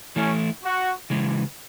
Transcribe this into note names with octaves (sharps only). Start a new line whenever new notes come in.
E3 A3 C#4 E4
F#4
C#3 E3 G#3